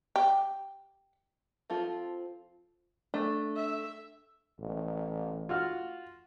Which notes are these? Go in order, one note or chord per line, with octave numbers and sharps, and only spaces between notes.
G4
F3 C4 F4 A4
A3 D4
E5
A1
F4 F#4 F6